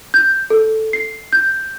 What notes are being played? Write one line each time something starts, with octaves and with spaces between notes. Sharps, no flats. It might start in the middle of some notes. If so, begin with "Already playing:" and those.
G6
A4
C7
G6